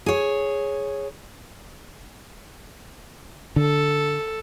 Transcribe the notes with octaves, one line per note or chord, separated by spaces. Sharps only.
G#4 C#5
D3 A4